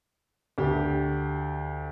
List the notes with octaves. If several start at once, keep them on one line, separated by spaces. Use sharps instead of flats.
D2 G4